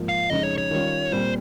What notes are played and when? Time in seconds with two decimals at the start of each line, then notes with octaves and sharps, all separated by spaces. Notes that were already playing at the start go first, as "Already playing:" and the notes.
Already playing: G#2 F3 A#3
0.09 F5
0.30 F2 C#3 G#3 D#4 D#5
0.43 C#5
0.58 C#5
0.71 D#3 G3 C#4 F4
1.12 A#2 G3 C4 C5